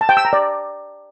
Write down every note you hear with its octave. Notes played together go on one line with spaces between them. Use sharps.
A5
G5
E6
A#5
D5